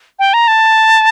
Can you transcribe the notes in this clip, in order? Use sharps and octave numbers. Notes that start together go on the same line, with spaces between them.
G5
A#5
A5